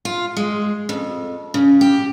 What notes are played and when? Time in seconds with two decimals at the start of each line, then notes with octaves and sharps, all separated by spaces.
0.05 F4
0.37 G#3
0.89 F2
1.54 C#3
1.81 G4